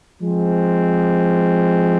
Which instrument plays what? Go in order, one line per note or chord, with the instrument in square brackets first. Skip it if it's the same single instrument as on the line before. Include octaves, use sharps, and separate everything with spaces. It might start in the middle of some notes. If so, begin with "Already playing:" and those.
[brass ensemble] F3 G#3 C4